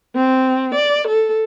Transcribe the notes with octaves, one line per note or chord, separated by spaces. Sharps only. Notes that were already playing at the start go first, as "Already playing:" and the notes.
C4
D5
A4